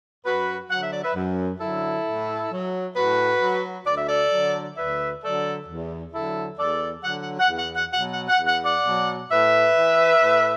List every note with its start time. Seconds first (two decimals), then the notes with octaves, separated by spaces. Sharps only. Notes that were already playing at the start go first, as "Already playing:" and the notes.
0.24 F#2 F#4 B4
0.70 D3 F#3 F#5
0.81 E5
0.93 D5
1.04 B4 E5
1.15 F#2
1.60 D3 F#3 E4 A4
2.06 A2
2.51 F#3
2.96 A2 F#4 B4
3.42 F#3
3.87 D2 D5
3.97 E5
4.07 A4 D5
4.32 D3 F#3
4.77 D2 B4 E5
5.23 D3 F#3 A4 D5
5.68 E2
6.13 D3 F#3 E4 A4
6.59 E2 A4 D5
7.04 D3 F#3 F#5
7.22 F#5
7.40 F#5
7.49 E2
7.58 F#5
7.75 F#5
7.94 B2 F#3 F#5
8.11 F#5
8.29 F#5
8.40 E2
8.47 F#5
8.65 D5 F#5
8.85 B2 F#3
9.30 A2 B4 E5
9.76 E3
10.21 A2